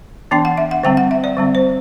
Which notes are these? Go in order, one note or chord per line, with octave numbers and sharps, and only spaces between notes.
E3 B3 D4 G5
F#5
E5
F#5
D3 G3 C4 G5
F#5
E5
D5
D3 G3 C4
C5